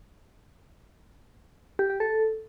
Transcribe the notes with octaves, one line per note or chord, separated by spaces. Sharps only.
G4
G4
A4